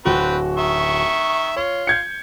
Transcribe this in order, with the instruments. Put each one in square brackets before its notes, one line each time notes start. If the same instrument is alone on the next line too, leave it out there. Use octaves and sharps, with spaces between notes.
[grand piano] D1 F#4 [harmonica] C4 B4 G5
[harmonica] D#3 E5 C#6
[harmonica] F4 [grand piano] C#5
[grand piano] G6 G#6 C#7